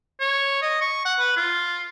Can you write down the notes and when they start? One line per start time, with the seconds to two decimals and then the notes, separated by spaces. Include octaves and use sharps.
0.20 C#5
0.62 D#5
0.81 C#6
1.05 F#5
1.19 B4
1.37 F4